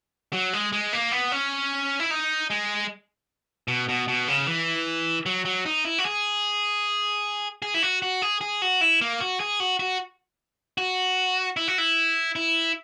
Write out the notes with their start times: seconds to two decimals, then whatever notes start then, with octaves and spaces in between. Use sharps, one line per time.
0.33 F#3
0.53 G#3
0.73 G#3
0.93 A#3
1.12 B3
1.32 C#4
2.00 E4
2.11 D#4
2.50 G#3
3.68 B2
3.89 B2
4.08 B2
4.28 C#3
4.47 E3
5.26 F#3
5.45 F#3
5.66 D#4
5.85 E4
5.98 F#4
6.05 G#4
7.62 G#4
7.74 E4
7.83 F#4
8.02 F#4
8.22 G#4
8.41 G#4
8.62 F#4
8.81 E4
9.01 A#3
9.21 F#4
9.40 G#4
9.60 F#4
9.80 F#4
10.78 F#4
11.57 E4
11.68 F#4
11.78 E4
12.36 E4